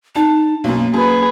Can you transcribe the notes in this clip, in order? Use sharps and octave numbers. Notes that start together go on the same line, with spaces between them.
D#4 A5
B1 F#2 A#3
F#2 G#4 B4